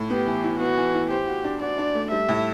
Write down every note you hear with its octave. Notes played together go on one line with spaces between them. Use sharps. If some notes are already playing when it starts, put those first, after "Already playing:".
Already playing: A2
B3 G4
E3
E4
B3 F#4
E3
E4
G4 C5
F#4
D4
F#4 D5
D4
A3
G3 E5
A2